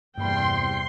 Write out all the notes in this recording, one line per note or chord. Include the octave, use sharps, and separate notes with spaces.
E2 G2 C3 G3 A#3 G5 B5 C6